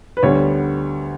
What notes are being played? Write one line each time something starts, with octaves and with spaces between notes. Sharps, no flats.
B4
D2 D3 G3 B3 C#5